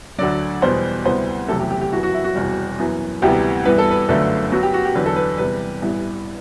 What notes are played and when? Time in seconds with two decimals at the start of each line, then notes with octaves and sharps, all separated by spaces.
0.18 D2 D3 F#3 D5
0.62 E2 B2 G3 B3 C5
1.05 D2 C3 E3 G3 B3 C5
1.48 F#1 E2 C3 F#3 A3 A4
1.59 G4
1.71 G4
1.81 G4
1.92 G1 F#2 E3 F#4
2.03 F#4
2.14 E4
2.24 F#4
2.35 E1 E2 C3 G3
2.79 F#2 E3 B3
3.22 D2 C3 E3 G3 B3 G4
3.65 G2 E3 B3 B4
3.78 A4
3.91 B4
4.08 G1 F#2 D3 A3 A4
4.52 F#2 F#3 B3 F#4
4.63 G4
4.74 F#4
4.85 G4
4.95 E2 D3 F#3 B4
5.06 A4
5.16 B4
5.38 E2 C3 G3 B4
5.82 A1 G2 E3 B3